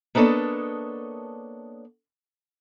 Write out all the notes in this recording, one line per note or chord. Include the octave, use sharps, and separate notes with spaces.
A#3 B3 D4 A4 C#5 D#5